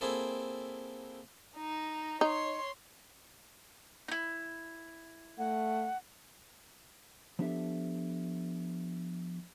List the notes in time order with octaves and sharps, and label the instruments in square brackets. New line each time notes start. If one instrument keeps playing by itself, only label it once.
[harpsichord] A#3 C4 E4 G#4 A4
[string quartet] D#4
[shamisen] D#4 [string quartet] C#5 C6
[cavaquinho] D#4 E4
[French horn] A3 [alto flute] F#5
[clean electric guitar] F3 B3 D4 G4 A4 E5